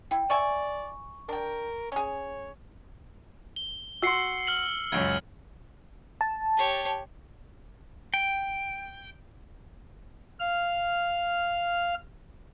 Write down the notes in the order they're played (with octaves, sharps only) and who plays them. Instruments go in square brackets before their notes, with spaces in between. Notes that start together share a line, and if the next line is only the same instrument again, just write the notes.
[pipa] E4 [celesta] G5
[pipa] C#5 E5 G#5 [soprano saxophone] D5 [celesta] C#6
[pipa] D4 G5 [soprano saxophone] A#4
[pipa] C#4 G#4 [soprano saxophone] C#5
[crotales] G7
[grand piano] F#4 C6 [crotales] E6 C7 C#7
[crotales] F6 C7 F#7
[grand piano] C#2 F#2 C#4 [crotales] G#6
[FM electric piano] A5
[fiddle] G4 C#5
[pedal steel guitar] G5
[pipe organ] F5 F6